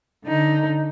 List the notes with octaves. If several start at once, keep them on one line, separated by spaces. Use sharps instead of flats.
D3 D#4